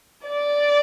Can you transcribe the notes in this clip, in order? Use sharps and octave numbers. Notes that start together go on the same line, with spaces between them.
D5